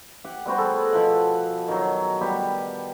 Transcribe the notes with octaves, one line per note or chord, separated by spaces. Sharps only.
G4 F#5
G3 B3 F#4 C5
F#4 G#4 A4
B2 F3 F#5
D#3 F#3
G3 B3 G4